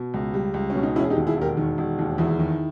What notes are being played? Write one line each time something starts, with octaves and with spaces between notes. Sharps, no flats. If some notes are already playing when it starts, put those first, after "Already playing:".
Already playing: B2
C#2
G3
C#2
C#4
B2
D#4
E1 C#4 E4
G#4
D#4 G4
D#2
E4 G#4
E1 G4 A#4
D#3
E1
D#2
E2 E4 G#4
D#3